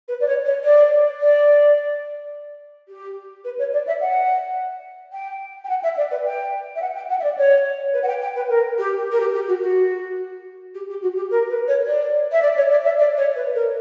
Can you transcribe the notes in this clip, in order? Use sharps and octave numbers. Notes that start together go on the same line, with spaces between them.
B4
D5
C#5
C#5
D5
D5
G4
B4
C#5
D5
E5
F#5
G5
G5
F#5
E5
D5
B4
G5
E5
F#5
G5
F#5
E5
D5
C#5
B4
F#5
G5
G5
B4
A#4
G4
A#4
G4
G4
F#4
F#4
G4
G4
F#4
G4
A#4
B4
C#5
D5
E5
D5
C#5
D5
E5
D5
C#5
B4
A#4